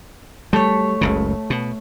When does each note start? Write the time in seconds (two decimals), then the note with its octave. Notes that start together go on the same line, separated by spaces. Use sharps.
0.53 G3 A3 C#5
1.01 F#1 C#2 C#3
1.50 B2